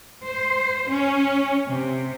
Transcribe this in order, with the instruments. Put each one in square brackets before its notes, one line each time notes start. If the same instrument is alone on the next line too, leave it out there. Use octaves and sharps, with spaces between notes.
[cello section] C5
C#4
C3